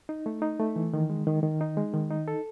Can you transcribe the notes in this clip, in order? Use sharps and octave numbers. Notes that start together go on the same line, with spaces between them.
D#4
A3
D#4
A3
E3
D#3
G#3
D#3
D#3
D#4
G#3
D#3
D#4
A4